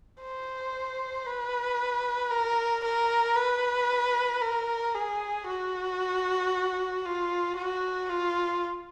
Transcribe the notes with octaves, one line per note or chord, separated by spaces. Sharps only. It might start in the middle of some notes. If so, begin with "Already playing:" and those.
C5
B4
A#4
A#4
B4
A#4
G#4
F#4
F4
F#4
F4